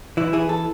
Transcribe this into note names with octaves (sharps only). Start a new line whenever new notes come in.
E3 E4
E3 G#4
A4